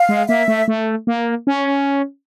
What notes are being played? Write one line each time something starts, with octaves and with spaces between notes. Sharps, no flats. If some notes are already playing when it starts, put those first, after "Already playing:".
Already playing: F5
G#3
A#3 E5
A3
A3
A#3
C#4